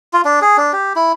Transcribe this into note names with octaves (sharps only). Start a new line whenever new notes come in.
F4
D4
G#4
D4
G4
E4